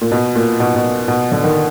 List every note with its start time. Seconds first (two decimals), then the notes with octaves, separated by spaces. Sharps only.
0.01 A#2
0.12 B2
0.36 A#2
0.60 B2
0.76 B2
1.08 B2
1.32 D3
1.44 D#3